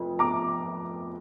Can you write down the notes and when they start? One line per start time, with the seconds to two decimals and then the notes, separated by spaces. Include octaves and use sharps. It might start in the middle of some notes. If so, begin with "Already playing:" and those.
Already playing: F1 F2
0.19 A#5 D6